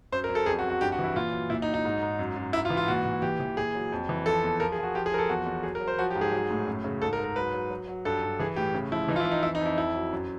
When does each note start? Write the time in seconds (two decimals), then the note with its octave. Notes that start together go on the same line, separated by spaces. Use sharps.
0.12 F#2 C5
0.24 A#4
0.29 F#2
0.35 A4
0.46 F2 G#4
0.59 F#4
0.63 F2
0.70 F#4
0.81 G2 G4
0.92 F#4
0.99 E3 E4
1.16 A#2 F4
1.32 F#3
1.50 A#2 E4
1.62 D#4
1.68 F#3
1.74 D#4
1.85 G#2
2.03 G#2
2.19 F#2
2.36 F#2
2.53 G#2 E4
2.65 F4
2.70 E3
2.77 F4
2.88 A#2 F#4
3.05 A#2
3.22 E3 G4
3.40 E3
3.57 A#2 G#4
3.75 F#3
3.92 F2
4.09 E3
4.26 F3 A4
4.44 E2
4.60 F3 A#4
4.72 G#4
4.78 F3 F#4
4.95 F3 G4
5.06 G#4
5.12 F3 A#4
5.18 A4
5.29 E2 F#4
5.46 E2
5.63 F#3 G#4
5.75 A#4
5.81 F#3
5.88 C5
5.98 F3 F#4
6.11 G4
6.16 G#2
6.21 G#4
6.32 F#3
6.51 A2
6.67 F#2
6.84 C#3
7.01 G#2 A4
7.13 A#4
7.18 G#2
7.24 A#4
7.36 F#3 B4
7.54 F#3
7.70 F#3
7.88 F#3
8.05 G2 A4
8.23 G2
8.40 E3 G#4
8.56 A2 G4
8.74 C#3
8.92 F3 E4
9.09 E3 D#4
9.16 F4
9.20 E4
9.26 E3
9.31 D#4
9.43 F2 E4
9.55 D#4
9.61 F2 E4
9.78 F2 E4
9.95 F#3
10.12 F#2